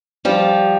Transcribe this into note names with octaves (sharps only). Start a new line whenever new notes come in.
F3 G3